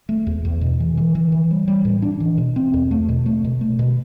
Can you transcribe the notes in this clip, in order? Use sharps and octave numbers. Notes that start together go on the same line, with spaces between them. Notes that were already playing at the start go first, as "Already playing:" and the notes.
A3
E2
E2
B2
E3
E3
E3
E3
G3
G3
A2
D4
E3
B2
C4
E2
A3
B2
A3
B2
A3
B2